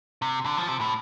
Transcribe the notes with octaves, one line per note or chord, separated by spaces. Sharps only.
C3
D3
F3
C3
A2